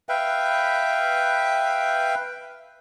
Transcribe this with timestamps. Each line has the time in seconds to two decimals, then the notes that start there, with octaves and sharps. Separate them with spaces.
0.09 B4 E5 F5 G5